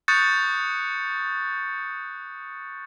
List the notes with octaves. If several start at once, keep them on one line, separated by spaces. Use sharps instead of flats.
C#6 D#6 F#6 G6 A6 C#7